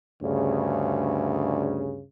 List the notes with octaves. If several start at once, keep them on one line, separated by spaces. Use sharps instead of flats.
D2 G2 C#3